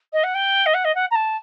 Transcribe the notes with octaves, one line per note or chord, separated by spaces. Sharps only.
D#5
F#5
G5
D#5
F#5
D#5
F#5
A#5
A5